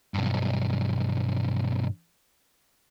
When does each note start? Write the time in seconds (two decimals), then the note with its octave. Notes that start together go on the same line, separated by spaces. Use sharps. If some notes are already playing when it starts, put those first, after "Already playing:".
0.14 B1 G2